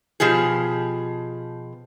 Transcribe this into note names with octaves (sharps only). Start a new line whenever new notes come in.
B2 F3 G4 G#4